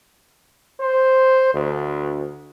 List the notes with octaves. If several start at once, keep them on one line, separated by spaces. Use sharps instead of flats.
C5
D2